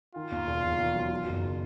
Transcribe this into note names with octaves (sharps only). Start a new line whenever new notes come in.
D#3 F4
D#2
E1
E1
D#3
F#3
F#3
F#1